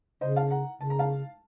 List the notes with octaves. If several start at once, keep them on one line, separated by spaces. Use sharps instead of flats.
C#3 C5 D#5
F5 A5
F#5 A#5
C#3 A5
A#5
F5 A5